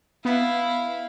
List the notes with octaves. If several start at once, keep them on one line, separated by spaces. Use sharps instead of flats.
B3 E4 F5